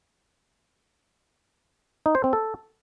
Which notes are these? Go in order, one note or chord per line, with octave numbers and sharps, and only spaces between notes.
D#4
C5
C4
A4